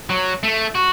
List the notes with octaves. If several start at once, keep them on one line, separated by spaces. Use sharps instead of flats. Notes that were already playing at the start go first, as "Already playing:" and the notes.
F#3
A3
F#4